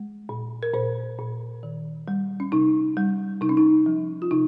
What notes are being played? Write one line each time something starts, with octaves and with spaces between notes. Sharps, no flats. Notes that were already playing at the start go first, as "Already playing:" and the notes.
Already playing: G#3
A#2
A#4
A#2 C5
A#2
D#3
G3
C#4
C3 D#4
G3
C3 D#4
C#4
D#4
F3
F4
C3 D#4